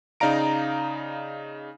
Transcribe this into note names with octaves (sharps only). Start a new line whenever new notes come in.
C#3 D#4 D5 F5 A#5 D7